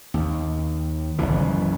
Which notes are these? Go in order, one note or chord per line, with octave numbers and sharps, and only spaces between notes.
D#2
F#1 C2 C#3 E3